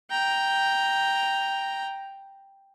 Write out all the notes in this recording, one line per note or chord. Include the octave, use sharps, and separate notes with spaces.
G5 A#5